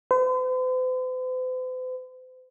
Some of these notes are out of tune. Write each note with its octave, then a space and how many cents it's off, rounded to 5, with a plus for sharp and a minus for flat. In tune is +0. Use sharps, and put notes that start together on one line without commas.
C5 -45